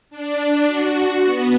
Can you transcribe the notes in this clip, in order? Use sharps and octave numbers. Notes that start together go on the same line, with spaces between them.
D4
F#4
F#4
B3